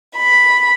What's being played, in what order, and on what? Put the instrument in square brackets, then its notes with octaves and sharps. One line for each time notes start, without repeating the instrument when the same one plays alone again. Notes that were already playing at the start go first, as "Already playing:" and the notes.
[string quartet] B5